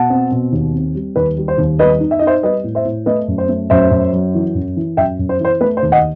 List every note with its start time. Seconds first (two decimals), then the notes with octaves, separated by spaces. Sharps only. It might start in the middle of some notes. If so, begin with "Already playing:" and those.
Already playing: B2 F#5 A5
0.10 C4
0.31 B2
0.52 D#2
0.74 C4
0.95 G3
1.16 D#2 B4
1.37 G3
1.48 C5
1.58 D#2
1.79 G3 B4 D#5
2.00 D#4
2.11 E5
2.19 D#4 D#5
2.27 C5 E5
2.43 G3 B4 D#5
2.64 A2
2.75 C5 E5
2.85 A2
3.06 A3 B4 D#5
3.28 F#2
3.38 C5
3.49 A3
3.70 F#2 C5 E5
3.91 F#2
4.13 F#3
4.34 E3
4.55 F#2
4.77 E3
4.97 F#2 E5 G5
5.19 F#2
5.29 C5
5.40 E3 C5
5.61 A3 B4
5.77 C5
5.83 D#2
5.92 D#5 F#5